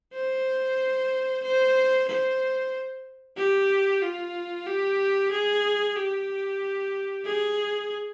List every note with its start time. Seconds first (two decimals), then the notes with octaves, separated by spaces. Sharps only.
0.14 C5
1.43 C5
2.08 C5
3.37 G4
4.02 F4
4.66 G4
5.31 G#4
5.96 G4
7.25 G#4